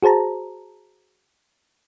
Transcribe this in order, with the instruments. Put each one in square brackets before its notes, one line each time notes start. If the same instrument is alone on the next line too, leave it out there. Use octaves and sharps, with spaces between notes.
[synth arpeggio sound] F#4 G#4 C5 A5 A#5